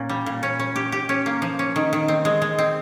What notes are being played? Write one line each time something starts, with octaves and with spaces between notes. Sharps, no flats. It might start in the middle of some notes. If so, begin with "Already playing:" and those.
Already playing: A#2 C#4
G3
A#2
C#4
C#4
G4
G4
C#4
A#3
F3
C#4
D#3
D#3
C4
G#3
G#3
C4